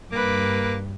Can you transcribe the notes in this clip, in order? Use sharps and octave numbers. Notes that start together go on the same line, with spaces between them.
G2 A#3 B4 D6